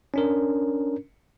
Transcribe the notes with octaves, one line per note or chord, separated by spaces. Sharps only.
C#4 D4 A#4